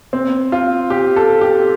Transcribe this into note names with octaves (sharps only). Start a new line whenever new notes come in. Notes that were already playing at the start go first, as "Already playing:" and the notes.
C4
F4
G4
A4
G4